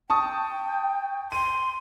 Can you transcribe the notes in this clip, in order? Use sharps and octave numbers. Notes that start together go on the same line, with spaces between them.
G5 A5 C#6 D#6
C6 D#7